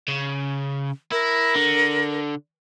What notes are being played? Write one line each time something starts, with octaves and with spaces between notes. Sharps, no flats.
C#3
E4 A#4
D3